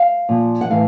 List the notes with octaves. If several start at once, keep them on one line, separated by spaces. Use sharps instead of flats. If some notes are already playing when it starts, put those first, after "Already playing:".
Already playing: F5
A#2 F3
F#5
A2 E3 F5